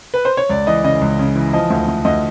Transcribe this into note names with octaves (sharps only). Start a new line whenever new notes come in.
B4
C5
C#5
C#2 D5
E3 D#5
C#3 D#5
C#2
C#3
E3
F3 D#5
D2
D2
D2 D#5